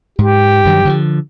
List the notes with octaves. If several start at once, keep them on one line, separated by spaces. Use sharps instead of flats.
G#2 G4
G2 D#3 F#3
D3 D#3 F3